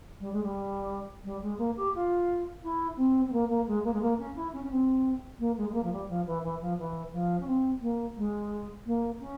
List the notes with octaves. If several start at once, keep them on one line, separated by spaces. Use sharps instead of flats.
G3
G#3
G3
G3
G#3
A#3
G4
F4
E4
C4
C4
A#3
A#3
G#3
A#3
G#3
A#3
C#4
E4
C#4
C#4
C4
A#3
G#3
G#3
A#3
F3
G3
F3
E3
E3
F3
E3
F3
C#4
C4
A#3
G#3
A#3
C#4